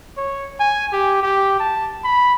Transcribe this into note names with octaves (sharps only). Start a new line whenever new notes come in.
C#5
G#5
G4
G4
A5
B5